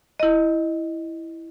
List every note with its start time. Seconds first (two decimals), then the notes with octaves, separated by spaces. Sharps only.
0.20 E4 D#5